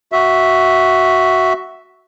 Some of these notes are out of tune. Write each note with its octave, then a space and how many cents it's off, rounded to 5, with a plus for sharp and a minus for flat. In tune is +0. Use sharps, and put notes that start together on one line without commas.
F#4 +5 E5 -5